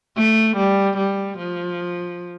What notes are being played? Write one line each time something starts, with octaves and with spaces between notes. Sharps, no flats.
A3
G3
G3
F3